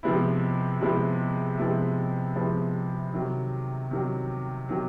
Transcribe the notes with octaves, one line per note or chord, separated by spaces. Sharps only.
C3 F3 G#3 B3 E4
C3 F3 G#3 B3 E4
C3 F3 G#3 B3 E4
C3 F3 G#3 B3 E4
C3 D#3 F#3
C3 D#3 F#3
C3 D#3 F#3